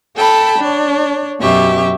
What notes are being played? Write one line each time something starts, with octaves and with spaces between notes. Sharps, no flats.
A4 G5 A5 B5
D4 C#5
F#2 B2 G4 E5 C#6